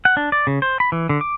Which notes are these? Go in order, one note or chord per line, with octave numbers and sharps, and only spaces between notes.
F#5
D4
D5
C#3
C5
B5
E3
D3
D6